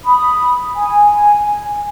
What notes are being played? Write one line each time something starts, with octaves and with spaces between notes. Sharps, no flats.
B5 D#6
G#5